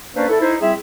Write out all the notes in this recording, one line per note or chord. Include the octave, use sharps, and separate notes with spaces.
A#3 C#4 D4 B4 C5 D5
E4 A4
D#4 E4 C5
G3 C4 E4 G#4 E5